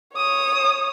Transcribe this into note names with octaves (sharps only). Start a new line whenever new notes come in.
C#5 D#6